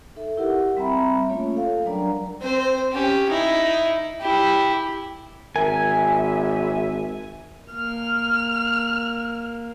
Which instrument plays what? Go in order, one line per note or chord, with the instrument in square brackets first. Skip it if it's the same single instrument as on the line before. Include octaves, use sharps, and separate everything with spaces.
[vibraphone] D#4 A4 E5
E4 G4 A#4 F#5
G3 C4 E5 A#5 B5
A3 A#3 C#4 F4 C#5
A4 F5
F#3 G3 D4 A#4 D5 A#5
[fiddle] C4 C5
C#4 G4
D#4 E4
[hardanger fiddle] E4 G4
[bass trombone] G#1 [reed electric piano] A#4 [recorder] E5 [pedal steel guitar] G#5
[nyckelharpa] A#3 [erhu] F6